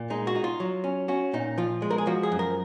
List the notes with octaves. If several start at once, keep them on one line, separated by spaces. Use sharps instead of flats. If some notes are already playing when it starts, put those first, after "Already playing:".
Already playing: A#2
G#3 D#4
F#4
D#4
F4
F#3
C#4
C#4 F#4
A#2 D#4
F3 F4
G#3
A#4
G#4
F3 F#4
G#4
F#2
A#4